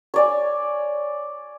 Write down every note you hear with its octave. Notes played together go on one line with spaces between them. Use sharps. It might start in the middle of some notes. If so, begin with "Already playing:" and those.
C#5 D5 G#5